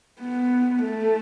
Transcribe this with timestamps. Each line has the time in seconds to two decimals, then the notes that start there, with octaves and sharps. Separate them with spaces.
0.21 B3
0.82 A3